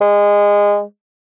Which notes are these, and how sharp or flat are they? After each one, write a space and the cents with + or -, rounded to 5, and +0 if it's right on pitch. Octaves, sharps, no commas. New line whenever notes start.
G#3 -20